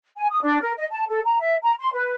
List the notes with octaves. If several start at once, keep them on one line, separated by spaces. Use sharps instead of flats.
G#5
D#6
D4
A#4
D#5
A5
A4
A#5
E5
A#5
C6
B4